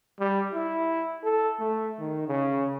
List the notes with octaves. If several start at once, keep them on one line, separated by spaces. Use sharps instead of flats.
G3
E4
A4
A3
D#3
C#3